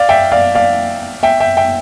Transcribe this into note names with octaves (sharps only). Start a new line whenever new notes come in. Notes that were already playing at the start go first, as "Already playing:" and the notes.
Already playing: D5 F5
E5 G5
D5 F5
D5 F5
E5 G5
E5 G5
E5 G5